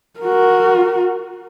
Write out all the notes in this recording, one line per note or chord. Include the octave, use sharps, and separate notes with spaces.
F#4 A#4